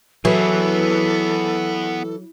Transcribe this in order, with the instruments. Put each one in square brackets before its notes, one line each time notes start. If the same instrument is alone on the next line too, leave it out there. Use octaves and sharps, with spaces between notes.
[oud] E3 [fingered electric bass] F#3 [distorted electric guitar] B3 G#4 [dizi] A4